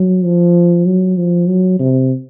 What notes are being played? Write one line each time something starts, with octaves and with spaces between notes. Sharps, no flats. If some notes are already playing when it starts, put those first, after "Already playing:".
Already playing: F#3
F3
F#3
F3
F#3
C3